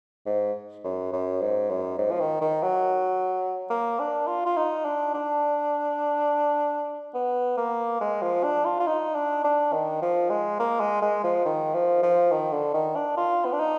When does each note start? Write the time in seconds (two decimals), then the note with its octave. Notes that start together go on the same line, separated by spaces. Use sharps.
0.26 G#2
0.84 F#2
1.13 F#2
1.41 G#2
1.69 F#2
1.98 G#2
2.11 F3
2.20 D#3
2.41 D#3
2.62 F#3
3.70 A#3
3.99 D4
4.27 F4
4.46 F4
4.57 D#4
4.85 D4
5.14 D4
7.14 B3
7.57 A#3
8.01 G#3
8.22 F3
8.43 D4
8.65 F4
8.80 F4
8.87 D#4
9.15 D4
9.44 D4
9.73 D#3
10.02 F3
10.30 G#3
10.59 A#3
10.80 G#3
11.02 G#3
11.24 F3
11.45 D#3
11.74 F3
12.03 F3
12.31 D#3
12.53 D3
12.74 D#3
12.96 D4
13.17 F4
13.45 B3
13.53 D4
13.60 D#4